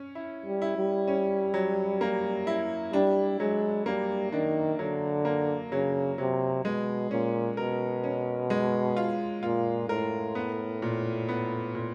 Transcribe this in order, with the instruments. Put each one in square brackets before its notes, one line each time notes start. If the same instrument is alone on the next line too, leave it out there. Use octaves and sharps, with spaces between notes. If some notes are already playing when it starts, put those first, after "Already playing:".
Already playing: [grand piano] C#4
E4
[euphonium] G3
[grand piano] E4
[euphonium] G3
[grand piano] C#4
F#3
A#3
E4
[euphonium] G3 [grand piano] D4
[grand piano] F#3 [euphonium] G#3
[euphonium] G3 [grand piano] A#3
[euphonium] D#3 [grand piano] D4
[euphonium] D3 [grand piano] F#3
[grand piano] A#3
[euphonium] C#3 [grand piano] F#3
[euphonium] C3 [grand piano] F#3
[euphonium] B2 [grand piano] G#3
[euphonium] A#2 [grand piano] C#4
[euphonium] B2 [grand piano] A#4
[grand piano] C#4
G#3
F4
[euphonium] A#2 [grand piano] F4
[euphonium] A2 [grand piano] A#4
[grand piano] B3
A#2
B3
A#2